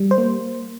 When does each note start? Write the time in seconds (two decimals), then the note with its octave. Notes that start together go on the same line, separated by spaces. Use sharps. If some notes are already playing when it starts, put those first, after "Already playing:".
Already playing: G3
0.11 C5
0.18 A#3